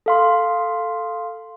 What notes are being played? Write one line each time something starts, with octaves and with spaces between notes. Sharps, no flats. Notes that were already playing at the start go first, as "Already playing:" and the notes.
A4 F5 C6